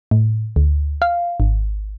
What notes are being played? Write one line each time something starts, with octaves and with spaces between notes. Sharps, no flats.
A2
D2
F5
G#1